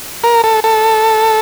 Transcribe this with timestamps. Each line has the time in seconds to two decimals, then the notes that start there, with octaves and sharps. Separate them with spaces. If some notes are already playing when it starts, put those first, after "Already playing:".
0.24 A#4
0.44 A4
0.64 A4